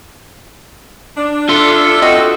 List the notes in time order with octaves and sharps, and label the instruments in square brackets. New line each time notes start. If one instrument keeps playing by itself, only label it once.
[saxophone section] D4
[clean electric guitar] F4 E5 C6 [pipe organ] A4
[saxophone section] C4 F#4 [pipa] D#5